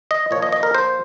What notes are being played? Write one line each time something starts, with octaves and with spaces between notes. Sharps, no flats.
D#5
A#2 F3 C#5
D#5
D#5
A#4
C5